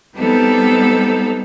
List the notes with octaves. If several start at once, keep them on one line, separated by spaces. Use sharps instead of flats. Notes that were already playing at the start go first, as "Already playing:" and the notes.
G3 B3 C4 D#4 A4